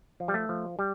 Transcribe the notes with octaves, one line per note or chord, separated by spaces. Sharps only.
F3
G3
A3
F3
G3